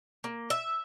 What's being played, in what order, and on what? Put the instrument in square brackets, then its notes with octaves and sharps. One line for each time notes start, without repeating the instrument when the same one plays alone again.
[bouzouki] A#3
E5